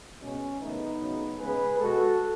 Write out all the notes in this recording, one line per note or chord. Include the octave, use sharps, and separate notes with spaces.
B2 G#3 B3 C#4
F#2 C#3 E3 A3 B3 D#4
C#3 F#3 A3
C#3 G#3 B3 G#4 B4
B2 G#3 B3 F#4 A4